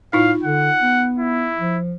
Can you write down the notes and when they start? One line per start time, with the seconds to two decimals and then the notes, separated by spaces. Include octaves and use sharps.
0.13 A2 D#4 F4 F5
0.43 D3 F#5
0.82 B3
1.18 E4
1.59 F3